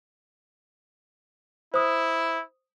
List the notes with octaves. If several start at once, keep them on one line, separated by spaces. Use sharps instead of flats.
E4 C5 D#6